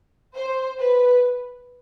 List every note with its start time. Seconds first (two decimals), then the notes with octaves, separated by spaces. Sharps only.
0.35 C5
0.79 B4